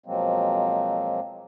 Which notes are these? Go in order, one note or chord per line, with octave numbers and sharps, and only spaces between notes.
B2 F3 F#3 G#3 A#3 C4